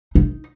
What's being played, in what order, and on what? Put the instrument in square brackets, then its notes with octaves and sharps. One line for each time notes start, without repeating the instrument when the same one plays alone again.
[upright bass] D#4